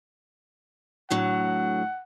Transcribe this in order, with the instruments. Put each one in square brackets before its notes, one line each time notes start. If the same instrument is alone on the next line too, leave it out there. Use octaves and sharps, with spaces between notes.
[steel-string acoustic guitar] A2 D3 F#3 [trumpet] F#5